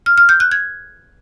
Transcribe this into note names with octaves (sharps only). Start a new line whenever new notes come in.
F6
F6
G6
F#6
G#6